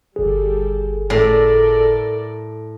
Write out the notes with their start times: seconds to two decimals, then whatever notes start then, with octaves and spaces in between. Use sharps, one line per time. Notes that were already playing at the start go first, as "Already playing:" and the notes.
0.16 G1 G3 G#4 A4
1.10 A2 A4 A#4 D5